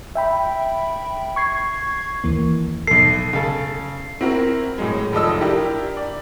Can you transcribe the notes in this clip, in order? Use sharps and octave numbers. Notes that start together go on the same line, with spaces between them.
E5 G5 B5
C#6 G#6 C7
D#2 E3 A#3
B1 A4 C7
C#3 A4
C4 E4 F#4 A#4
A2 F#3 G#3
F1 F3 A4 D#5 E6
D4 E4 G4 A#4
D5